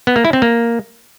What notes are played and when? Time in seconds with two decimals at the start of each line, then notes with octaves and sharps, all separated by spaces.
0.07 B3
0.16 A#3
0.25 E4
0.33 C4
0.42 A#3